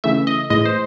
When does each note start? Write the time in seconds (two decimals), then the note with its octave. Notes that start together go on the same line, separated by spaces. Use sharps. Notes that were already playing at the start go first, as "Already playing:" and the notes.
0.04 C#3 E3 A3 E5
0.27 D#5
0.50 A2 E3 G#3 D#5
0.65 C5